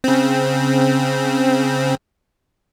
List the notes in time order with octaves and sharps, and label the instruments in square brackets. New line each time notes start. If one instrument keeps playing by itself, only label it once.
[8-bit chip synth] C#3 C4